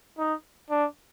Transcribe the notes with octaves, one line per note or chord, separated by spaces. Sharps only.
D#4
D4